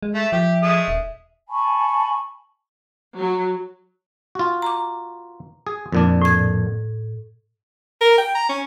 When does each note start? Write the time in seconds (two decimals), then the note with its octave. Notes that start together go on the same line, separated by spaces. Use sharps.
0.03 G#3
0.14 A3 E5
0.32 F3 G4
0.63 G#3 A3 D#6
0.88 D#1
1.49 G#5 A5 B5 C#6
3.19 F#3
4.35 F4 F#4
4.62 A#5 D6
5.67 G#4
5.92 F2 A#2 D4
6.22 A2 G#6
8.01 A#4
8.18 G5
8.35 A#5
8.49 C#4